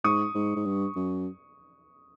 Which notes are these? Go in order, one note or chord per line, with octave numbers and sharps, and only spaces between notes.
G#2 C#6 D#6
G#2
G#2
G2
F#2